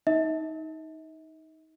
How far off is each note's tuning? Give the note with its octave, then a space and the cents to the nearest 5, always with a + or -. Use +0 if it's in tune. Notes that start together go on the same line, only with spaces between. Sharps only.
D#4 +15 E5 -45